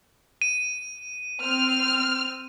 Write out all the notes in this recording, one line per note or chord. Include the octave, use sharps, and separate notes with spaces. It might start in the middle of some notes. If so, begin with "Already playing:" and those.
D#7
C4 F6